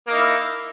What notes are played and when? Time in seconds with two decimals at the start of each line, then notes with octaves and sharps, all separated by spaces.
0.07 A#3
0.11 D#4
0.16 E4